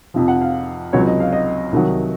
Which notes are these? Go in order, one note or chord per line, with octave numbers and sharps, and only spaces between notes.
F2 C3 F3
F#5
F5
C#2 C3 F#3 C#5
D#5
F5
D#5
C2 C3 D#3 F#3